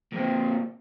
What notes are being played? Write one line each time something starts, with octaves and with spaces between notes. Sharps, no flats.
A#2 C4